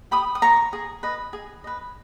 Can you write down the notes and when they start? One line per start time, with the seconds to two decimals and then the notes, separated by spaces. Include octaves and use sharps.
0.11 G4 B5 D#6
0.35 D#6
0.42 C#5 A#5 C#6
0.73 G#4
1.03 B4 D#5
1.33 G#4
1.64 B4 D#5